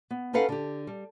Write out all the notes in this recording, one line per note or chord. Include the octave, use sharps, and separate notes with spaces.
B3
C#4 D#4 A4 B4 F5 F#5
D3 G4
G3